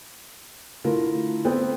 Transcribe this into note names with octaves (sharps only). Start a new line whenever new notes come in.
D3 A3 E4 F4 A#4
B3 C4 A4 G5